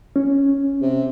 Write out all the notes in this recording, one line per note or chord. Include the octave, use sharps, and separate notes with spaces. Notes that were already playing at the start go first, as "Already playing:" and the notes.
C#4
C3